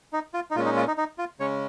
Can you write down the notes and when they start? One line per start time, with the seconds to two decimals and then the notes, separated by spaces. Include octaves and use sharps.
0.13 D#4
0.34 F4
0.51 D#4
0.55 A#2 G#3 C#4 F4
0.65 D#4
0.76 F4
0.87 D#4
0.98 D#4
1.18 F4
1.40 C#3 G#3 C#4 C#5